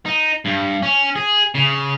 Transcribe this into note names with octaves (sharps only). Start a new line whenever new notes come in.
D#4
G2
C#4
G#4
C#3